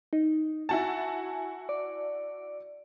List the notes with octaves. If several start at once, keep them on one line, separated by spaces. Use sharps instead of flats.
D#4
E4 F#4 G#5 A5
D5